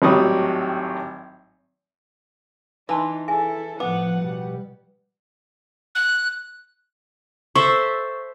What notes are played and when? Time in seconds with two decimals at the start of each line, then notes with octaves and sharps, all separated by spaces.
0.02 G#1 A2 F#3 G3 C#6 D#6
2.89 E3 D4 D#4 E5 A5 C6
3.28 E4 G#4 A4 E5 G#5
3.80 A2 F3 B3 F#5 D6
4.19 B2 G3
5.95 F#6
7.56 A4 C5 E5 C#6